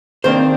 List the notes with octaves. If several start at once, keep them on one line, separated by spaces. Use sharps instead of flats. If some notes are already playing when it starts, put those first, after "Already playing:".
D#3 A#3 C4 D4 C5